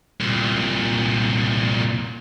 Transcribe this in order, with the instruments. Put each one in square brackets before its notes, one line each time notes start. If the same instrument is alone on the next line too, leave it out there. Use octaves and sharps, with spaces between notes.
[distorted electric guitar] C2 A#2